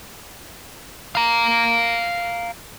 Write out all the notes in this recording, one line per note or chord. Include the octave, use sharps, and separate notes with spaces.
F5 A#5